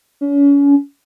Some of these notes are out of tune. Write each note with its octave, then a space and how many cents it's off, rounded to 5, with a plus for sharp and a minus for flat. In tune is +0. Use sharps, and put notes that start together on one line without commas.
C#4 +35